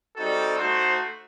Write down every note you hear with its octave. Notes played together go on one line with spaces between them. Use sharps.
G3 C4 D#4 F#4 A4
A3 D#4 F#4 C5